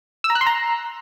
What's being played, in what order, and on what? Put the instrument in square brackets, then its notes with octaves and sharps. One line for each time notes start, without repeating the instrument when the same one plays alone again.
[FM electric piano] E6
A#5
F#6
C6
A#5